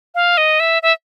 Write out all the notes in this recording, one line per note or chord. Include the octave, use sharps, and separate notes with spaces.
F5
D#5
E5
E5